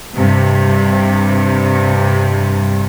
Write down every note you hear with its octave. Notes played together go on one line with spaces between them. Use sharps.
G2 C3